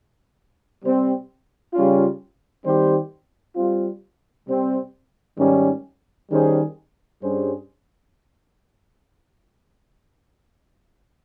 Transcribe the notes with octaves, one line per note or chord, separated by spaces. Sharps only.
C3 G3 C4
C#3 G3 C#4 F4
D#3 G3 C4 G4 C5
G3 C4 F4
C3 G3 C4
G#2 D#3 G3 C#4
D#3 G3 C#4 G#4 C5
G2 G3 C#4 G#4 C5